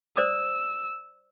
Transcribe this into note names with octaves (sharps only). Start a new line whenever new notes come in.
C5 D5 D#6 E6